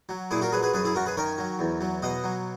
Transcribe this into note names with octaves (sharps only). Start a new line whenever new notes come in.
F#3
A#2 E4 G#4
F#4 A#4
F#3 G#4 B4
G#4 B4
F#2 G#4 B4
E4 G#4
F#2 F#4 A#4
G#4 B4
D#3 A#4 C#5
F#3
E2
F#3
B2 D#5 F#5
F#3